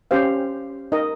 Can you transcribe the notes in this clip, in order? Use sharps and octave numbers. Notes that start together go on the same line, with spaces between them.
C#4 G4 C5 F5
D#4 A#4 D#5